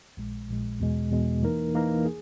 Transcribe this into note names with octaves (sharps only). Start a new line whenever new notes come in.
A#1 A#2 G#3
A#1 A#2 G#3
E2 B2 G#3
E2 B2 G#3
E3 A#3 D#4 A#4
E3 A#3 D#4 A#4
G#4